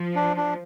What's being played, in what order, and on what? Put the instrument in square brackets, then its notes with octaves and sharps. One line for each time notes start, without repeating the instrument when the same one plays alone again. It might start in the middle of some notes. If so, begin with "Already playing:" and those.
Already playing: [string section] F3
[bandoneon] D4
D4